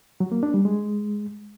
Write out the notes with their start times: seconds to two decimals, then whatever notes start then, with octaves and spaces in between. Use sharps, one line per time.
0.20 F#3
0.32 A#3
0.43 D4
0.54 G3
0.65 G#3